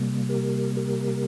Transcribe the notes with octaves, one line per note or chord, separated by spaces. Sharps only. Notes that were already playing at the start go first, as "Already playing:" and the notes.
Already playing: C3 G3 A#3
G4 A#4
G4 A#4